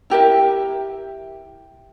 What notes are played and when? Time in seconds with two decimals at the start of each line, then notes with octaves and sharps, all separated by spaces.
0.10 E4 G4 A#4 E5